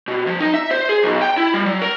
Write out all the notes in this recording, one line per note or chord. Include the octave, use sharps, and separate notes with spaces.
B2
F3
D#4
E5
C5
G#4
B1
G5
E4
G3
F#3
A#4